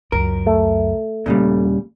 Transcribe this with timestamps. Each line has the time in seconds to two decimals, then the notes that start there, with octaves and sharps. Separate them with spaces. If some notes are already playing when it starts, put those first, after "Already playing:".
0.12 C#2 F#2 A#4
0.46 A3
1.26 D#2 A#2 C#3 G3 A#3